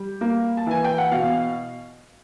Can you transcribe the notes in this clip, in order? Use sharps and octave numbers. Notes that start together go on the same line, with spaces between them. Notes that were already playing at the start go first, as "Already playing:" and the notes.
Already playing: G3
A#3
A5
E3 G#5
G5
F#5
B2 F5